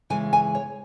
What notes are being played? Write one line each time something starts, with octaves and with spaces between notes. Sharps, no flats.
C#3 E3 G#3 G#5
G#5
C#5